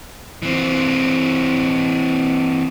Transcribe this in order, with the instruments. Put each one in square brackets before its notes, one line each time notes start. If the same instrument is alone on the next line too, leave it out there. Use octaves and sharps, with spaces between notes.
[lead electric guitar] E3 C4